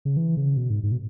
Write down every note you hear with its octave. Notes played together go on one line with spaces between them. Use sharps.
C#3
E3
C#3
B2
G#2
G#2
B2